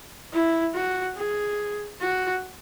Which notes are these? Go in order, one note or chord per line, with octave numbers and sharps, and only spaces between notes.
E4
F#4
G#4
F#4